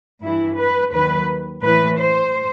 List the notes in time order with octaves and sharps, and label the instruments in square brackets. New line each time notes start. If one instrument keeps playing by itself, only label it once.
[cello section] G2 E3 E4
B4
D#2 D#3 F#3 B4
A2 E3 B4
C5